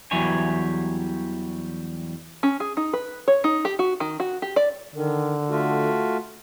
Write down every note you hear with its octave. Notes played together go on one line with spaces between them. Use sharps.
E2 E3 F#3 G3 C#5 G#5
C#4
G#4
D#4
B4
C#5
D#4
G4
F#4
D#3
F#4
G4
D5
D3 D#3
A3 F4 F#4